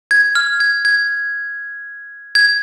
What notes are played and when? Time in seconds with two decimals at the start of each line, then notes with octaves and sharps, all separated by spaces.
0.11 G#6
0.35 F6
0.60 G#6
0.85 G#6
2.35 G#6